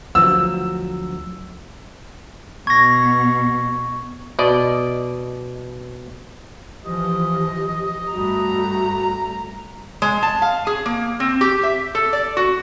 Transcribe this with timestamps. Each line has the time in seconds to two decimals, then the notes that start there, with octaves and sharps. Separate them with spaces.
0.15 D2 F3 F#3 E6
2.67 B2 C#6 G#6 A#6
4.39 B2 D5 D#5
6.84 E3 F3 G4 D#5
8.13 G2 G3 A3 F#4 A#5
10.02 G#3
10.23 A5
10.42 F5
10.67 G#4
10.86 A#3
11.20 C4
11.41 G4
11.63 E5
11.95 A4
12.13 D5
12.37 F#4